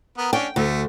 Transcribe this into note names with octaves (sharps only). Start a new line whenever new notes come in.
B3 A#4
C#4 D4 G5
D2 A3